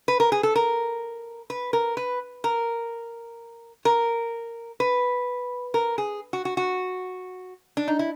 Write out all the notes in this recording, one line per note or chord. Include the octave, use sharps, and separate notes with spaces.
B4
A#4
G#4
A4
A#4
B4
A#4
B4
A#4
A#4
B4
A#4
G#4
F#4
F#4
F#4
D4
D#4
E4